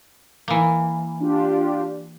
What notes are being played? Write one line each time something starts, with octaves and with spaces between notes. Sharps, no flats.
E3 A#3
D4 F4 G4